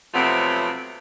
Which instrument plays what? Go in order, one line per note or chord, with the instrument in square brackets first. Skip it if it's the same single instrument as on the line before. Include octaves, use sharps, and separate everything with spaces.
[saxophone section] C3 F3 F#3 A3 B3 C4